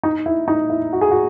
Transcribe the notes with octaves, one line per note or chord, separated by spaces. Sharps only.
D#4
E4
D#4
E4
F#4
G#4
F#4